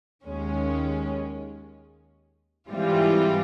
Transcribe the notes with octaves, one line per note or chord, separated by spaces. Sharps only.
D#2 D#3 G#3 C#4
G#2 E3 G3 C4 F4